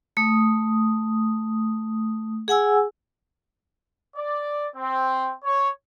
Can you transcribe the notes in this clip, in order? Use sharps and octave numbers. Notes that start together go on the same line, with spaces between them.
A3 D#6
G#4 F#5 G#5 E6
D5
C4
C#5